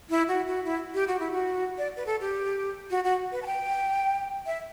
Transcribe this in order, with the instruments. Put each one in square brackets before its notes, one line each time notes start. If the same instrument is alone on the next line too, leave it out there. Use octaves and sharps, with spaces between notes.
[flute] E4
F#4
F#4
E4
G4
F#4
E4
F#4
D5
B4
A4
G4
F#4
F#4
B4
A5
G5
E5